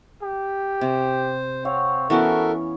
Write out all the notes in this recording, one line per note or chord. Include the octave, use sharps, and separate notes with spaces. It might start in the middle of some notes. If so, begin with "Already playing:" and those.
G4
C3 C5
C4 C#5 F5 F#5
E3 B3 C#4 F#4 A4 A#4 E5